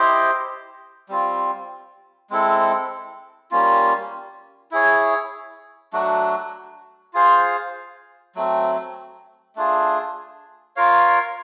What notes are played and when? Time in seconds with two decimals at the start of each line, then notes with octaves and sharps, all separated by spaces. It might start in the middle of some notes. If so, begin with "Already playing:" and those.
Already playing: E4 G4 C5 D#5
1.09 G3 C4 F4
2.30 G#3 C4 E4 A4
3.51 G3 A#3 C#4 F4
4.72 E4 G#4 C#5
5.93 F#3 A3 D4 F#4
7.14 F4 G#4 C5 F5
8.35 F#3 A3 C4
9.56 A3 D4 F4 G#4
10.76 F4 A#4 C#5 F5